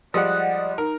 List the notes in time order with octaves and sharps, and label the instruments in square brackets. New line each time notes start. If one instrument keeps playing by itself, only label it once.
[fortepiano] F3 G3 G#3 [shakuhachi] D5 [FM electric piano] D#5 F#5
[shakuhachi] D#4 [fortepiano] A#4